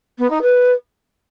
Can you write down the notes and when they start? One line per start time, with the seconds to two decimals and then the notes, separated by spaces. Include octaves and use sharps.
0.18 B3
0.30 D#4
0.42 B4